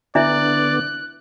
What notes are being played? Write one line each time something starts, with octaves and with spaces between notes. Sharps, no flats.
D3 B3 D4 E4 D5 E5 F#6